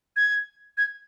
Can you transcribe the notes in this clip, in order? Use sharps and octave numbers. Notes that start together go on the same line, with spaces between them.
G#6
G#6